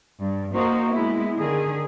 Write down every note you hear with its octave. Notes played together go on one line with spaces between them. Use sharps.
G2
A#3 D#4 F#4 C5
G#3 B3 E4
D3 D#3 G#4